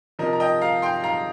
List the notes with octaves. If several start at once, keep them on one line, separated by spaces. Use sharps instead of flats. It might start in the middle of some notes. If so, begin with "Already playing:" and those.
C3 F3 A#4 D#5
A#5
D#5 G5
F5 A#5
G5 C6
F5 A#5